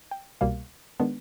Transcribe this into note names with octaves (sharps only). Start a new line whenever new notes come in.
G5
C2 B2 G3 A#3 F5
D#3 G#3 B3 D4